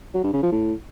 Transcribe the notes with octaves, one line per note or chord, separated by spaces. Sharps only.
F#3
G2
C#3
F3
A2